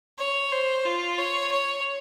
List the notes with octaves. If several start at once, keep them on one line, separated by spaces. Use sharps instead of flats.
C#5
C5
F4
C#5
C#5